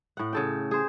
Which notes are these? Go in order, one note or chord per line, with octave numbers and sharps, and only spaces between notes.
A2 F#5
C#3 A4 G5
G#4 C5